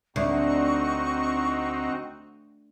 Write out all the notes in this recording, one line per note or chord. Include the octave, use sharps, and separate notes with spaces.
D2 C4 D#4 F#4 C#6